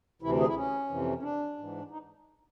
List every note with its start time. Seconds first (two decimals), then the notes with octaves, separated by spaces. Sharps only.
0.22 D2 C3 E3 E4
0.40 G#4
0.47 E4
0.56 C#4
0.90 F2 C3 E3
1.18 C#4
1.23 D4
1.58 G#2 E3
1.91 D#4